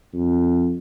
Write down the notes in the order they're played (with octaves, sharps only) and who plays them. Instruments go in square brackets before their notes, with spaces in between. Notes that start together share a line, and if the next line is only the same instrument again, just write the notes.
[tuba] F2